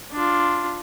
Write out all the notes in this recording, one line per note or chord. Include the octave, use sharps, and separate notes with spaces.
D4 F4